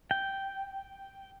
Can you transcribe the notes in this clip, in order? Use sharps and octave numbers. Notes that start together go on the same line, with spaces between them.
G5